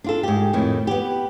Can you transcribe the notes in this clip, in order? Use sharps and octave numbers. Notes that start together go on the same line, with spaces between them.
D4 F4 A4
G#2 G4
F2 A2 D#3
B3 G4